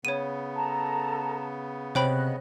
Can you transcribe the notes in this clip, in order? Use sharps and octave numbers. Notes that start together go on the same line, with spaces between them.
C#3 B3 C#5 D#7
A4 A5 A#5
C3 C5 C#5 D#5 G5 B5 F#6